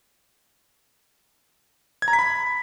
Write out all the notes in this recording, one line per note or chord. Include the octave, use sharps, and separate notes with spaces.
G#6
A#5
B6
B5